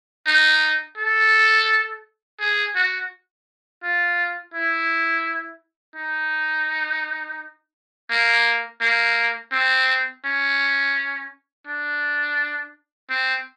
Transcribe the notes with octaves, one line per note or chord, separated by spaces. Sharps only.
D#4
A4
G#4
F#4
F4
E4
D#4
A#3
A#3
C4
C#4
D4
C4